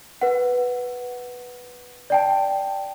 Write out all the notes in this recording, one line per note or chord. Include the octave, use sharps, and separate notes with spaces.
B4 F#5
D5 G5 A5